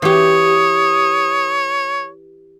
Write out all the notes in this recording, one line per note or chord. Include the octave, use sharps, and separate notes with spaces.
E3 G4 C#5 D#6